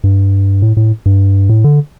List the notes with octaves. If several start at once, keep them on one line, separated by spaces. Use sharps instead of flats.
G2
A2
A2
G2
A2
D3